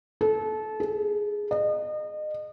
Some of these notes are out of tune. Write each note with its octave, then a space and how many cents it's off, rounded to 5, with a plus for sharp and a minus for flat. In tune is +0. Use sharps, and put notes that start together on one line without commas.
A4 -25
G#4 +0
D#5 -35